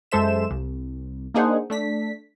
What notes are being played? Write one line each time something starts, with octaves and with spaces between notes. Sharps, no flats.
F#2 G#3 A4 C5 E5 E7
C2
A#3 D4 D#4 G#4 C5 F#5
A3 D4 B6